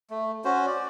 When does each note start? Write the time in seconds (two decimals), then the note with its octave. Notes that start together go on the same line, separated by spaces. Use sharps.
0.10 A3
0.45 C#4 F#4 C5
0.67 D5